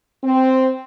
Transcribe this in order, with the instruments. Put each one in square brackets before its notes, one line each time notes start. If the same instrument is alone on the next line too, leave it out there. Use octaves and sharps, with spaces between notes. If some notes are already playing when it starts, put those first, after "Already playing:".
[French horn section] C4